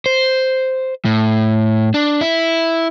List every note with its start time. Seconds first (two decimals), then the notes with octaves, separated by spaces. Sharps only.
0.06 C5
1.05 A2
1.94 D4
2.21 E4